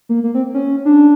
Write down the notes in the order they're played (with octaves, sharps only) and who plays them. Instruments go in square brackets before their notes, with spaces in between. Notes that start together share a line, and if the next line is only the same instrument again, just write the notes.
[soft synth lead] A#3
A#3
C4
C#4
D4